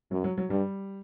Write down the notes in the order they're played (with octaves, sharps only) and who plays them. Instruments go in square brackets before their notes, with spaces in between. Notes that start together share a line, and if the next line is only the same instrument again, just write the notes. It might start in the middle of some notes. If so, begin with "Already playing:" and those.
[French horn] F#2 [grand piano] F#3
[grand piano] F#3
F#3
[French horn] G2 [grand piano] G3